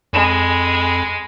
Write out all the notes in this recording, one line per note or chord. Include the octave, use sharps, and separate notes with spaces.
F2 G#3 B5